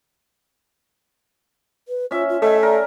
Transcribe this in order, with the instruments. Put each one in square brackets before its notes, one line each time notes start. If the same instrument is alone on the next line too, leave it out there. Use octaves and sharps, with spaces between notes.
[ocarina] B4
[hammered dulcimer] C#4 E5 [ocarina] F4
[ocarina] F4
[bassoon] A3 [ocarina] D#5 [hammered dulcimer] E5 G#5
[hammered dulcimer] A#4 [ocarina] D5